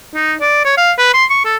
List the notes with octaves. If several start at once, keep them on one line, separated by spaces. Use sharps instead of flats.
D#4
D5
C#5
F5
B4
C6
C#6
A4